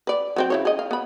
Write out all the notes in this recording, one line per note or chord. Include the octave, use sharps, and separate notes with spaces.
B4 D5
F#3 C4 G5
C#3 E4 C#5
G#4 D#5
F5
B3 B5